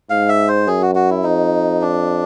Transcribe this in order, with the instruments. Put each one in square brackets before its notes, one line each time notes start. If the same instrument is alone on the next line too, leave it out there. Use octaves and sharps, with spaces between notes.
[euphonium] G#2 [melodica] F5
[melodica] E5
C5
[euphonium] F#2 [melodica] G#4
[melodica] F#4
F#4
E4
[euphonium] F2 [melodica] D#4
[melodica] D4